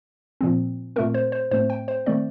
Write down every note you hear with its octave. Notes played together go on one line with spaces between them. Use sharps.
A#2 F3 C4
A#2 A3 C4 A#4
C5
C5
A2 A3 C4 C5
G5
C5
D#3 A3 C4 D5